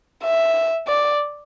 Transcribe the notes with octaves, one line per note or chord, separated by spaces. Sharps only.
E5
D5